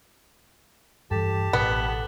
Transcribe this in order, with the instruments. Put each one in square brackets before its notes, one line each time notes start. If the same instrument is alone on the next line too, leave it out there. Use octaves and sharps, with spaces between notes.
[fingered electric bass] G2 E3 [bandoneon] G4 A5 [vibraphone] A4
[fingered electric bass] A1 B2 [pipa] B3